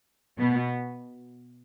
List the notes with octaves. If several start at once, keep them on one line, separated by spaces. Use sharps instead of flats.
B2 B3